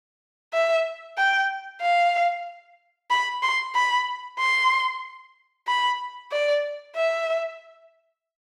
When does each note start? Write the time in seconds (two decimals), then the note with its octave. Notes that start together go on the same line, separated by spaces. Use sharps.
0.54 E5
1.18 G5
1.82 F5
3.10 B5
3.43 C6
3.75 B5
4.39 C6
5.67 B5
6.32 D5
6.96 E5